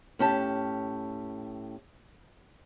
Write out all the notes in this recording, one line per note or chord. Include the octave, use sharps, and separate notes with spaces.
A2 C#4 G4 A5